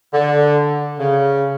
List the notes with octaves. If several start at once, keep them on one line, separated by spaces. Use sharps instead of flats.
D3
C#3